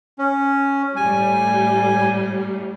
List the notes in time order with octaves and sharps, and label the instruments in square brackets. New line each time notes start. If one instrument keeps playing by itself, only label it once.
[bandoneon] C#4
[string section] A2 G3 [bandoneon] G#5